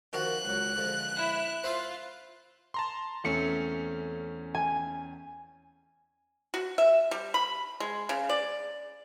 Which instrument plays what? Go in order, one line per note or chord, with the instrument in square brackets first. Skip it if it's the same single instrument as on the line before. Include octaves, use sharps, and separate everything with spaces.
[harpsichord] D#3 F3 F#4 [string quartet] F#6
[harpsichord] C#2 F#3
D3 F3 G#3
[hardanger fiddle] E4 E5
[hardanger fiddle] F4 [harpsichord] C5 E5 F5
[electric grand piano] A5 A#5 C6
[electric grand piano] E2 C#4 [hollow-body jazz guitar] A3 C4 [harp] C#7
[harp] G#5
[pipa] F#4
E5
G3
B5
G#3
C#3
D5